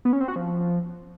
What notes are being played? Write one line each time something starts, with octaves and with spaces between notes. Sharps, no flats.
B3
C#4
C4
F#4
F3